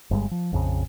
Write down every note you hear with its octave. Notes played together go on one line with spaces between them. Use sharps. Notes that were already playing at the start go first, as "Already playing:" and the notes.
G1 G2 G3 G#3
F3
A#1 F2 C#3